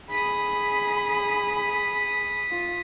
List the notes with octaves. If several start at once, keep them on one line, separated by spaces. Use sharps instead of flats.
G#4 B5 D#6 B6
F4